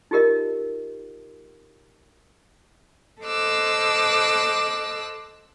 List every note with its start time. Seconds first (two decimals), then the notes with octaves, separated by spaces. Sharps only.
0.11 D#4 F4 G4 A#4 D#5
3.22 A4 C5 D#5 D6 E6 F#6